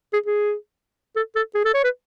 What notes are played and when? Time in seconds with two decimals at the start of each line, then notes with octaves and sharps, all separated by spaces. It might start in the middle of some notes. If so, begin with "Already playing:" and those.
0.13 G#4
0.26 G#4
1.16 A4
1.35 A4
1.54 G#4
1.65 A4
1.74 C#5
1.84 B4